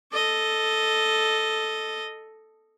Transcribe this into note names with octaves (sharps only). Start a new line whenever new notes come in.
A4 D#5